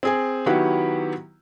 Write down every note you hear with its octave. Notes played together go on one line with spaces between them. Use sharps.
C4 G#4 G#5
D#3 F#3 B3 E4 F#4 G4